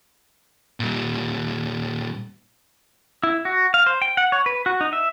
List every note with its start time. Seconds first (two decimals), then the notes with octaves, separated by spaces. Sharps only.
0.80 A#2 G3
3.23 E4
3.45 F#4
3.74 F5
3.86 C5
4.02 G5
4.17 F#5
4.32 C#5
4.46 B4
4.66 F#4
4.81 D#4
4.93 E5